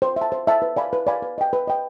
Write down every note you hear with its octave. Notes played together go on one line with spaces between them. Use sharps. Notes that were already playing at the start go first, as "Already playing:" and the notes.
C5
E5
A5
C5
E5 A5
B4
D5 F5 G#5 B5
B4
D5 F5 G#5 B5
B4
D#5 G5
B4
D#5 G5